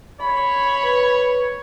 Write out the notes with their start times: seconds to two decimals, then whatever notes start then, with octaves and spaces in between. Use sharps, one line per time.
0.21 C#5 B5
0.83 B4